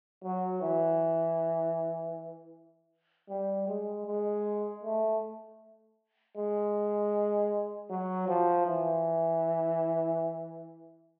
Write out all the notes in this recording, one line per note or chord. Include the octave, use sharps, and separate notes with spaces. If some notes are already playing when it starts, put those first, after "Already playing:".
F#3
E3
G3
G#3
G#3
A3
G#3
F#3
F3
E3